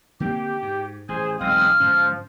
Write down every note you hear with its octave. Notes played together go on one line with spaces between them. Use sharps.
D3 A#3 C4 G4
G#2
A1 G#4 C5 G#5
E1 B1 G#3 C4 F5 D#6
G#2 D3 F3 C#4